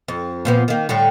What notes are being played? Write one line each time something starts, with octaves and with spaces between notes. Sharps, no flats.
F2
A#2 F3 B3
D#3 A#3
A2 D3 G3